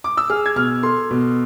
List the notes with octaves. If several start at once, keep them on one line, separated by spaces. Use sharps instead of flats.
D6
E6
G#4 F6
G#6
B2 F6
A4 C6
B2